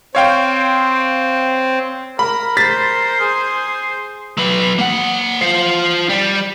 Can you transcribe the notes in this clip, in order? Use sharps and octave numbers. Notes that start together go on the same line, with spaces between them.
C4 C#5 F5 G5
A#4 B5
C5 C6 A6 B6
G#4
F#3 B4
A#3 F#5
F4 C5
G3